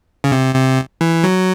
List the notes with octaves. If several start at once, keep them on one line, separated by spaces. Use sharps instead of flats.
C#3
C3
C3
E3
F#3